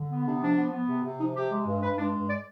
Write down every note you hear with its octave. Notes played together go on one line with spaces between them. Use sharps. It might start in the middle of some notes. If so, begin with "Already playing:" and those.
Already playing: D3
B3
C3 D4
F3 D4
B3
B3
C3
C3
F3 D#4
C3 G4
G#3
G2
G2 B4
G#3 D4
G2
D5